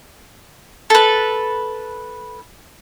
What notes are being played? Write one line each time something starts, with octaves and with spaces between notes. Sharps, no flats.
A4 B4